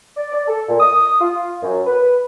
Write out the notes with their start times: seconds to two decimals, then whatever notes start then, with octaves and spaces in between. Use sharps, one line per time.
0.17 D5
0.32 D5
0.48 A4
0.69 A#2
0.80 D#6
1.21 F4
1.63 F#2
1.87 B4